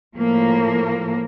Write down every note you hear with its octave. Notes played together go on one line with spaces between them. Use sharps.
A2 F3 A#3